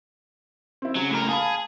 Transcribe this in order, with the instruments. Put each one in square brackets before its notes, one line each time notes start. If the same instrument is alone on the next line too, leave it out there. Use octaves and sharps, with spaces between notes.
[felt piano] C4 E4
[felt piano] C#3 [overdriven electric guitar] F#3
[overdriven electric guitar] A2 A#4
[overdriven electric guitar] G#4 [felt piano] F5 A5 B5